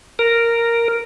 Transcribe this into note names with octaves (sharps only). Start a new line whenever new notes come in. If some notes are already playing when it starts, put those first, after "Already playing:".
A#4